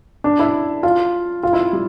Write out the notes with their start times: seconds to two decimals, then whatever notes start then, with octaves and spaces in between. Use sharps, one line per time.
0.24 D4
0.39 E4
0.83 F4
1.43 F4
1.53 E4
1.73 G3